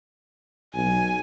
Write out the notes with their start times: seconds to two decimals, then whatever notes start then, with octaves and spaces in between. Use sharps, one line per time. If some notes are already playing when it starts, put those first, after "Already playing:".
0.75 B1 G#5